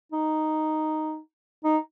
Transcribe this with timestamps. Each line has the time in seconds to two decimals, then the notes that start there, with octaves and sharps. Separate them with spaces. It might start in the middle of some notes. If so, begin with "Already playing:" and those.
0.12 D#4
1.64 D#4